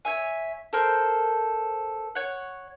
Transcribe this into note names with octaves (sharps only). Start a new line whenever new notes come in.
C#5 E5 G#5
A4 A#4 C5
C#5 F#5